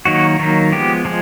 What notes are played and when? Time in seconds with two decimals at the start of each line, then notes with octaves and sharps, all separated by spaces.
0.05 D#3 F#3 A#3 D#4 F#4
0.39 D#3 F#3 A#3 D#4
0.72 F3 G#3 B3 G4
1.05 F3 G#3